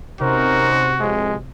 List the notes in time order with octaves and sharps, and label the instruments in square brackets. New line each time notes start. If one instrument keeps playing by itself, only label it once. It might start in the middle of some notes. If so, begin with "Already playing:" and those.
[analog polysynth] C3 [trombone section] C#4 D#4 C5 [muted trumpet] F#4 [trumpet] A#4
[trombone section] B1 F3 [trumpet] G#3